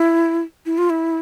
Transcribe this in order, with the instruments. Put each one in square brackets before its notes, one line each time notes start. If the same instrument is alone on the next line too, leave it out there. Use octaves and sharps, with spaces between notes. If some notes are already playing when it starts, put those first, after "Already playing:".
Already playing: [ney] E4
E4
F4
E4